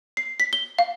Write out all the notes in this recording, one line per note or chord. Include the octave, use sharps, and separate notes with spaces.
C7
B6
G7
F5